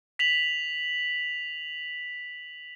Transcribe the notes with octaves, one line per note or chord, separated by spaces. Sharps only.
B6 F7 F#7